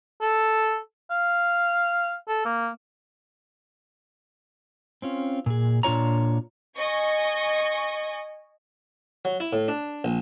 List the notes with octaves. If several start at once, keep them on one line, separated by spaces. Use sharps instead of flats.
A4
F5
A4
A#3
C4 C#4 F4
A#2 G#4
A#2 D4 F4 C#5 A#5
D#5 G#5 C#6
F#3
E4
A2
D4
A#1